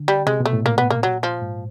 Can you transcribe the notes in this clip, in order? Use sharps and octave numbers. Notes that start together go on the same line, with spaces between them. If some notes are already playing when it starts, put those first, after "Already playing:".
Already playing: D3
G3
C3 G#3
B2
A3
A2
A#2 A#3
B3
A#3
F#3
F3
G#2